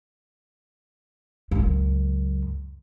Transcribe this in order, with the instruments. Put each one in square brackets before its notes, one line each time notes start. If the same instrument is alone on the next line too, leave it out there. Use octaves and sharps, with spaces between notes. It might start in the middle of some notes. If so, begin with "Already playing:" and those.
[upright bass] C#2 F#2